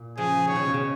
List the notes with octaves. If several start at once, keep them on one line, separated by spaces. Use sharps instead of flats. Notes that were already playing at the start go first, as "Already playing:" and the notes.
Already playing: A#2
C#3 F3 G#4
D#3 C#5
C#3
B2
C#3